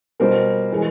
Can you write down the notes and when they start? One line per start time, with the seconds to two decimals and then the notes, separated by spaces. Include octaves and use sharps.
0.20 B2 G3 A#4 C5
0.72 E3 G#3